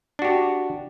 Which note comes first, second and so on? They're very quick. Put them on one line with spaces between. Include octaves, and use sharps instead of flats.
D4 F#4 G4